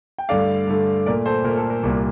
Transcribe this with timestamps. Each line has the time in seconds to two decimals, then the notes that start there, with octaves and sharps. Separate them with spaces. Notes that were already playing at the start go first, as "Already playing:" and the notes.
0.18 G5
0.29 G2 D3 A3 D5 F5
0.67 G2 D3 A3
1.06 A#2 A3 A#4 D5
1.26 A4 C5
1.44 A#2 A#4
1.48 A3
1.58 A4
1.70 A#4
1.83 C2 A#2 G3 A#3